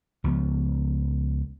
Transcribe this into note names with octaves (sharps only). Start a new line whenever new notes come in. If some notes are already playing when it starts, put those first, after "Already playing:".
C#2 F3 B3